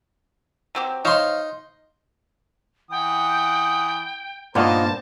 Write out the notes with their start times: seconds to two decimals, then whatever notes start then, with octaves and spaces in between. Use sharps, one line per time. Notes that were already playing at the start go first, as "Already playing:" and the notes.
0.75 F#3 C4 G4
1.05 D#4 C5 C#5 F5 C6
2.91 E3 F#5 G5 D#6
4.55 G2 A#2 B3 D#4 F4 A#4 C5 A5